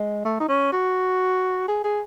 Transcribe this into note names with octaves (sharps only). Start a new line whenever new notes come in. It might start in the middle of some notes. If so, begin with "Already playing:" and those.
Already playing: G#3
A3
D#4
C#4
F#4
G#4
G#4